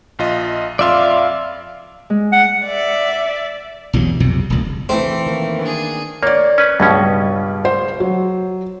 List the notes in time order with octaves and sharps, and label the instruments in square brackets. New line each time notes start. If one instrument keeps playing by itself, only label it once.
[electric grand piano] A#1 F4 D#5
[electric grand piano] F2 F4 C6 [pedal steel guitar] D5 E5 F5
[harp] G#3
[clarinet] F#5
[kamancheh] D5 E5
[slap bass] B1 E2 G2 F#3
B1 F2 C3
D#1 C#2
[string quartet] E3 [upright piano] A3 [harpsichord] C4
[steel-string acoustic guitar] D#3 A#3
[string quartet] D4 G#4
[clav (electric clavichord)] A#3 [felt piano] C#5 D5
[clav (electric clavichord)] C#4 B4
[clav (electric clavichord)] C#2 B2 C#4 [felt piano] G2
[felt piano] C5
F#3